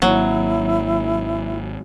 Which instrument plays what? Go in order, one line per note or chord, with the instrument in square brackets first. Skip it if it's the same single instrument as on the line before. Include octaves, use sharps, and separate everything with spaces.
[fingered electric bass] G#1 A#3 C4 [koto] F#3 [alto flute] E4